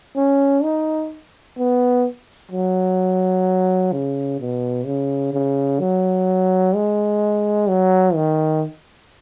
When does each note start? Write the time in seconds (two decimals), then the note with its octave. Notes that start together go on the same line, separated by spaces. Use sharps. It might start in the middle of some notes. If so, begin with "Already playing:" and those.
0.16 C#4
0.63 D#4
1.58 B3
2.51 F#3
3.92 C#3
4.40 B2
4.86 C#3
5.33 C#3
5.80 F#3
6.75 G#3
7.69 F#3
8.15 D#3